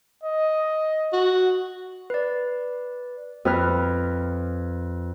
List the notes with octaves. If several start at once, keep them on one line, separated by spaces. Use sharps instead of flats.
D#5
F#4
B4 D5
F2 B4 F6